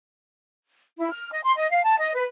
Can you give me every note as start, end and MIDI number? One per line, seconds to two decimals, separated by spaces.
0.97 1.10 64
1.11 1.29 89
1.32 1.41 75
1.43 1.53 84
1.56 1.69 75
1.70 1.81 77
1.83 1.98 81
1.98 2.10 75
2.15 2.24 71